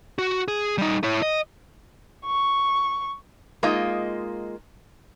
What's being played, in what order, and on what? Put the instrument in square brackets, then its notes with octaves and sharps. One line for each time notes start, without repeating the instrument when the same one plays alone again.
[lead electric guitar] F#4
G#4
G3 D#4
E4 C#5
D#5
[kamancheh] C#6
[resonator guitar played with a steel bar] G#3 A#3 D#4 F4 D#5